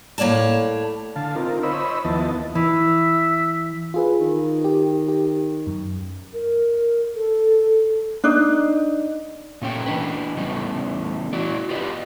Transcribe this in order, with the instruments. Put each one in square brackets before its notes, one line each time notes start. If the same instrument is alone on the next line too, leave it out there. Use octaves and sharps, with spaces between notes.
[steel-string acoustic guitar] A2 A#3 C#5 D5 A5
[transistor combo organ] D3 F5 A5
C4 D#4 F4 A#4
C5 C#5 D#5 B5 E6
D#2 F3 B3 E4 D#5 A5
[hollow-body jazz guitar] E3 [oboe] E5
[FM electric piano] F4 G#4 B4
[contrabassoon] D#3
[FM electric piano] G4
G4
F#2
[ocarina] A#4
A4
[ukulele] D4 D#4
[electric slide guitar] A#2 A3 C#4 C#5 G5
E3 G3 D4 B4
E3 G3 A3 B3 C#4
E4 F#4 D5
F4 G4 B4 D5 D#5